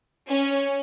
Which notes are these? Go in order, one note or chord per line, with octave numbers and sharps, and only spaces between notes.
C#4